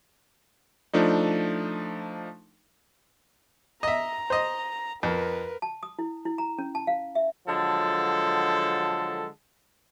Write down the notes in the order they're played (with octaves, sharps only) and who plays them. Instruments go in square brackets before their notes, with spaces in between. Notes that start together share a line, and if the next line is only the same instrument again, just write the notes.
[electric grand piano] F3 A3 D4 D#4
[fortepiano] D#5 E5 [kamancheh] A#5
[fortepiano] C5 D#5
[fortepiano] F2 [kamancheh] A#4 B4
[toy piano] A5
D#6
E4
E4
A#5
C#4
A5
F5
E5
[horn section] D3 F3 F#3 G#3 A4